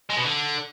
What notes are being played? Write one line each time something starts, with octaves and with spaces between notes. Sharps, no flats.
G#3
B2
D3